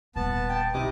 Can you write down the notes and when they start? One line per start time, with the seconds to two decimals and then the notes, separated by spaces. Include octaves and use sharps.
0.16 D#1 B3 A5
0.49 G5
0.74 B1 C3 D#4 E4 D#5 D6 D#6